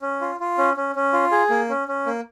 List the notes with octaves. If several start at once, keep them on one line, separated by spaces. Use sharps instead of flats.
C#4
F4
F4
C#4
C#4
C#4
F4
G#4
A#3
C#4
C#4
A#3